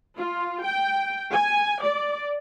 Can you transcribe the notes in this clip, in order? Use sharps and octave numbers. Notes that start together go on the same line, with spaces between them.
F4
G5
G#5
D5